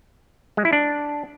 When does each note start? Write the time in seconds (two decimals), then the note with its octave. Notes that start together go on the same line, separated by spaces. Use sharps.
0.57 G#3
0.65 E4
0.73 D4